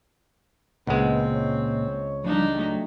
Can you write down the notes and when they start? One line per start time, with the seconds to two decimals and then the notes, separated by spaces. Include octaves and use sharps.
0.87 C#2 A#2 G#3 B3 C4 F#5
1.35 C#5
2.24 E3 F3 G3 D4 D#4
2.55 F#3 A3 G4